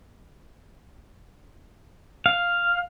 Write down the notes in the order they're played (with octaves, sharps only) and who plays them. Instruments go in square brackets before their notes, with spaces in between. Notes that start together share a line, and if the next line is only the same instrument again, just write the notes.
[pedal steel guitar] F5